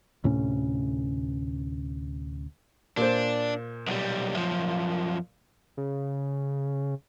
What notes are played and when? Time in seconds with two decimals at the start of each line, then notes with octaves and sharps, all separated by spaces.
0.24 D2 A2 C3 C#4
2.97 A#2 D4 C5
3.87 B1 G3
4.36 F#2 F3
5.77 C#3